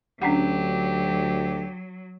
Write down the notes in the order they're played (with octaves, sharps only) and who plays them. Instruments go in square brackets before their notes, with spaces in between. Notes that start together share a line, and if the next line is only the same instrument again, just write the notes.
[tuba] D2 [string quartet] F#3 [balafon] C#4 D4 F#5 [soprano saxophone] G4